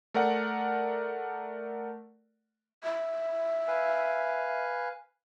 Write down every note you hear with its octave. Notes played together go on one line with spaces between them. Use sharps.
A3 A#4 D5 F#5
E5
B4 F5 G#5